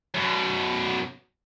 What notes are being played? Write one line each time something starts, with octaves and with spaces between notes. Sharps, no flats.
F#2 B2